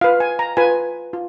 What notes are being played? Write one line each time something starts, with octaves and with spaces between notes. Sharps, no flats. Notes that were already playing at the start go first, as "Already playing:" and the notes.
F4 B4 F5
G#5
A#5
F4 B4 G#5
F4